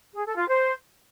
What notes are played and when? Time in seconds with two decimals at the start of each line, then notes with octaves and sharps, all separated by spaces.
0.15 G#4
0.26 A4
0.37 F4
0.48 C5